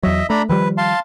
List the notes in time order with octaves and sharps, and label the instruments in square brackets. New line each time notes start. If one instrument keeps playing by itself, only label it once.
[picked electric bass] E2 F#3 [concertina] D#5 E5
[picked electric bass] A3 [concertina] D4 A#5 B5
[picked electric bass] D#3 F3 G3 [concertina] B4
[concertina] F5 A5 C6